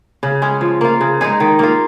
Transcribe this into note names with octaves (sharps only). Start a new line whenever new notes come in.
C#3
G#3 C#4
F3
A#3 F4
C#3
G#3 D#4 G#4
D#3
A#3 F4